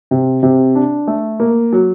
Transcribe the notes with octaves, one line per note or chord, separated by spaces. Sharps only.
C3
C3
D4
A3
A#3
F#3